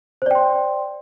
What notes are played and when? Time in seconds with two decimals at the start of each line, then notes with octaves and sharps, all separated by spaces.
0.22 C5
0.26 D5
0.31 G5
0.35 C6